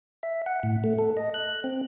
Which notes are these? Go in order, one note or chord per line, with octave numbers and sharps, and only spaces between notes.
E5
F#5
A2
A3
A4
D#5
F#6
C4